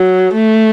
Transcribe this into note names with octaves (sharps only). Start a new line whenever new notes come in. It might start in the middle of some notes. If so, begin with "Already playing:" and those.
Already playing: F#3
A3